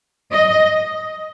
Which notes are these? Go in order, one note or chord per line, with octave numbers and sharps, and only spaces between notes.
D#5